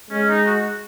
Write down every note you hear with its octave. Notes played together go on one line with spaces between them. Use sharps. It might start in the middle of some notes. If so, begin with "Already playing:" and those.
G#3 C#4
D#4
F#4